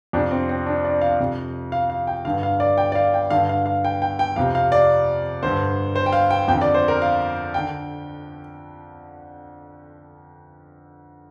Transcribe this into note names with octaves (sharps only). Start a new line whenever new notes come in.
F2 C3 D4
C4
C4
D4
D5
F5
F2 C3
F5
F5
G5
G2 D3 F5
F5
D5
G5
D5
F5
G5
G2 D3 F5
F5
F5
G5
G5
G5
F2 C3 F5
F5
D5
G2 D3 C5
C5
G5
F5
G5
F2 D3 G5
D5
C5
A#4
F5
D3 G5